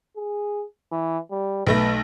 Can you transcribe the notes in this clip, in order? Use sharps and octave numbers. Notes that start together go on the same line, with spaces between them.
G#4
E3
G3
B1 A3 B4 A#6